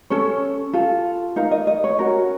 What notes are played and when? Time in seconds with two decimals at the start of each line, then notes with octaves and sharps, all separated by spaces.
0.10 C#4 A4 C#5
0.73 F4 A4
1.36 D#4 A#4 F5
1.51 D#5
1.67 D#5
1.84 C#5
1.99 C#4 F#4 A#4